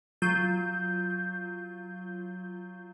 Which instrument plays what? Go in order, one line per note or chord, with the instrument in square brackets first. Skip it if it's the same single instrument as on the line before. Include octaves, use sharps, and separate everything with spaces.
[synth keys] F#3 F4 G6